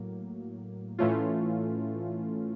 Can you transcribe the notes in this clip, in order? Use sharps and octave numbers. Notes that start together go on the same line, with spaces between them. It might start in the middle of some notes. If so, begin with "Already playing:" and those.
Already playing: A2 F#3 A#3
A2 E3 A3 C#4 F4